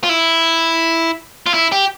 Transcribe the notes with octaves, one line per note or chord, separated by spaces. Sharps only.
F4
E4
F4
E4
G4